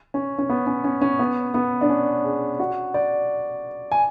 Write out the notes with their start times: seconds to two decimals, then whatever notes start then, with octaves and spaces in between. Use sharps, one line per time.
0.14 C#4
0.38 C#4
0.49 B3
0.67 C#4
0.84 C#4
1.01 C#4
1.19 B3
1.54 B3
1.81 D4
1.89 C#4
2.24 G#4
2.60 F#4
2.94 D5
3.92 G#5